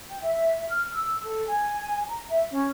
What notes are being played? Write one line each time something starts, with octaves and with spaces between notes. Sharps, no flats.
G5
E5
F6
E6
A4
G#5
A#5
E5
C#4